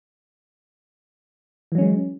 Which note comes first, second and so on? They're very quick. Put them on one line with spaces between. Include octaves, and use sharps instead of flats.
E3 F#3 C#4 G#3